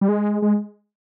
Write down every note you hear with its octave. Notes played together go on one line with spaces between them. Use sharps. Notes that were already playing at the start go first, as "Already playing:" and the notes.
G3
G#3
G#3